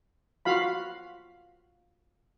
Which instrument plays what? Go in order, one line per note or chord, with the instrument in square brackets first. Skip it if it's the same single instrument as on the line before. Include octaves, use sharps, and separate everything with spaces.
[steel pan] F4 F#4 F5 B5